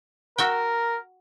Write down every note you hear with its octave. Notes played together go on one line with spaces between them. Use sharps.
F#4 A#4 E5 G5